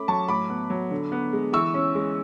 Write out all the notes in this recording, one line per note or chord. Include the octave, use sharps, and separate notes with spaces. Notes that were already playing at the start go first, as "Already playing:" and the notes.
Already playing: A3 C#4 B5 D6
F#3 A5 C#6
A2 B5 D6
B3
F#3
D3
B3
G#3
E3 C#6 E6
C#4
G#3